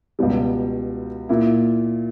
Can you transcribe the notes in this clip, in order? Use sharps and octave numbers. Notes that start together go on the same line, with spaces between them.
C#2 B2 G3
A#2 A#3 E4